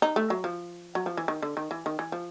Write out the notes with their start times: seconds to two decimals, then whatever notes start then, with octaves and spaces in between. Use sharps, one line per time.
0.02 D#4
0.16 A3
0.30 F#3
0.44 F3
0.95 F#3
1.06 F3
1.17 E3
1.28 D#3
1.42 D3
1.57 D#3
1.71 E3
1.86 D#3
1.99 E3
2.12 F3